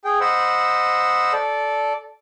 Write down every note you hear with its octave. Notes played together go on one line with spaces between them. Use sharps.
G#4 G5
C5 D#5 F#5 B5 E6
A4 D5